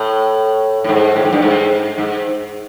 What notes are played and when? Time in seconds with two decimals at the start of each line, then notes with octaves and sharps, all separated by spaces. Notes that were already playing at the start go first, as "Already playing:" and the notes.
Already playing: A2
0.84 A2
0.89 G#2
1.16 A2
1.25 G#2
1.33 G2
1.42 G#2
1.98 G#2